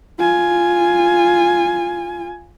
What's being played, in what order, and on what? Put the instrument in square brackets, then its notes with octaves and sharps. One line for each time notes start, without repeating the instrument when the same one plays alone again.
[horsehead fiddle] F4 G#5